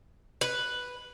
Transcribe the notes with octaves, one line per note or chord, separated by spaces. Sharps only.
B4